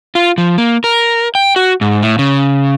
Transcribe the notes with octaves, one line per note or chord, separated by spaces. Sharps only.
F4
F3
A#3
A#4
G5
F#4
G#2
A2
C#3